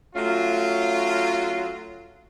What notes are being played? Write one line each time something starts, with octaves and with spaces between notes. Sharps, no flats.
F#3 A3 C#4 F4